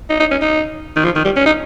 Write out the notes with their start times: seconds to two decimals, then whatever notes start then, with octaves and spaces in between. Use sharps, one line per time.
0.10 D#4
0.20 D#4
0.31 C#4
0.41 D#4
0.96 D#3
1.05 F3
1.16 D#3
1.25 G3
1.36 C#4
1.46 D#4